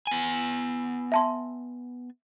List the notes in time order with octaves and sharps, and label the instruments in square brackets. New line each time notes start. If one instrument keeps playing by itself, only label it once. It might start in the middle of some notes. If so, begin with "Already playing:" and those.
[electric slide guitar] B3 G#5
[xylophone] E5 A5 C6